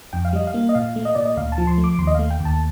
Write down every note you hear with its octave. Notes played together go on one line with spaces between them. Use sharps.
F2 G5
F5
G3 D#5
F5
A#3
D#5
A#2 F5
A3
D#5
A#2 D5
D#5
D2 F5
A5
F3
C6
A3
D6
D#2 C6
D#5
A3 F5
G5
D#2
A5